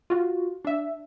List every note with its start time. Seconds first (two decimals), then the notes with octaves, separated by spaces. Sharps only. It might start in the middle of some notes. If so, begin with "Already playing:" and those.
0.10 F4 F#4
0.65 D4 E5